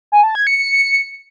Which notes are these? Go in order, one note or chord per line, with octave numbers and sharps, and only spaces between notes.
G#5
A5
G#6
C#7